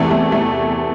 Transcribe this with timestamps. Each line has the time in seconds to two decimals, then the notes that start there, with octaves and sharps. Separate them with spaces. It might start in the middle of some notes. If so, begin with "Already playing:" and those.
Already playing: E2 C3 E3 A3
0.11 A3
0.32 A3